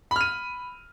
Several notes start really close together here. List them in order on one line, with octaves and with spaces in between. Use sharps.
B5 F6 D#7